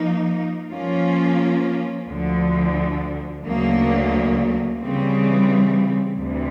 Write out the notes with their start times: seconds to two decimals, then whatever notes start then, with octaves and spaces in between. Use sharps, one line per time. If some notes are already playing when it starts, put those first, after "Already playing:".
Already playing: F3 A#3 D#4
0.71 F3 A#3 C#4 F4
2.08 D2 D3 F3
3.44 D2 C#3 F#3 A#3
4.79 C#3 E3 G3 C4
6.16 D2 C3 E3